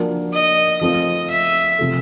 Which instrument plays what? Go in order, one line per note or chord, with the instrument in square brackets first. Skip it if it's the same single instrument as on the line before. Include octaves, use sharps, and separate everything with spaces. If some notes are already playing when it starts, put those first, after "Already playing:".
Already playing: [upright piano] F3 A#3 D4 F#4
[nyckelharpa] D#5
[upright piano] F3 A3 C4 F4 [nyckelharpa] D#5
[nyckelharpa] E5
[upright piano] C3 F3 A3